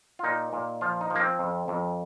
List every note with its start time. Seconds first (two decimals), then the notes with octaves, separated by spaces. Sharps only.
0.19 F4
0.24 A#2 D#4
0.53 A#2
0.81 F3 F4
1.01 D#4
1.10 F3
1.15 A#3
1.20 C4
1.39 F2
1.68 F2